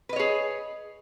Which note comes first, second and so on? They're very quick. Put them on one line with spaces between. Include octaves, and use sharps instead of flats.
B4 D#5 C#5 G#4